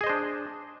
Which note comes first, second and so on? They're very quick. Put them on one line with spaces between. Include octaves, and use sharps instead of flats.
G#4 D#5 C5 D4